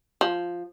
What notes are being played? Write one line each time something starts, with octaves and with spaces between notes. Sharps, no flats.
F3